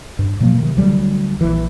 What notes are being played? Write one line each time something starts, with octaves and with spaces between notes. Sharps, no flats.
G2
B2 F3 F#3 A#3
C3 D#3
D2 F#3 G3
A#1 E3